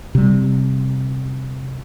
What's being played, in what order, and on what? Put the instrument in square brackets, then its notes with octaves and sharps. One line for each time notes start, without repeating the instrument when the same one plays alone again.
[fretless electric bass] C3 G3